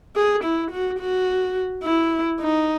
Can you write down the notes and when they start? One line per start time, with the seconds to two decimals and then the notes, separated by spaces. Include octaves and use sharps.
0.16 G#4
0.44 E4
0.71 F#4
0.99 F#4
1.84 E4
2.40 D#4